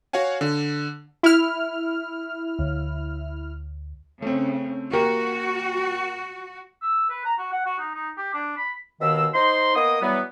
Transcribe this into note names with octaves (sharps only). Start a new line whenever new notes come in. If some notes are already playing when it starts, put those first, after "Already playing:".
F#4 C#5 F5 F#5 G#5
D3
E4 F6
D2
C#3 A3 C4
A#3 F#4 G4 A#4
E6
B4
A#5
F#4
F#5
F#4
D#4
D#4
G4
D4
B5
D#2 B2 D#3 F5 E6
D#4 C5 C6
A#3 B3 D#5 D#6
E3 F#3 G3 B3